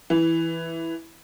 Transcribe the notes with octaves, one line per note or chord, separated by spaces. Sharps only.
E3